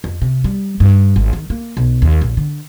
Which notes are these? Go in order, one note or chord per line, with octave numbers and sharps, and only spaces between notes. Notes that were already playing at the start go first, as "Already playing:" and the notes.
F2
C3
G3
G2
G#1
D#3
A#3
B1
D#2
A#1
D3